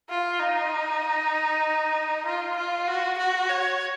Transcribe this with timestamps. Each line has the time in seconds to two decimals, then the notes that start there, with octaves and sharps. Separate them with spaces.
0.10 F4
0.40 D#4
2.26 F4
2.56 F4
2.88 F#4
3.18 F#4
3.50 C#5